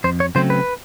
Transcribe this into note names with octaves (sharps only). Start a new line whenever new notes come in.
F2 C5
C#5
C#3 F#3 A3 C4 C5
B4